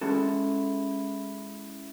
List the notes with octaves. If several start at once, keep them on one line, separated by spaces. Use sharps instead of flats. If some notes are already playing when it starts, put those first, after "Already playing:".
G#3 C#4 E4 F#4 A4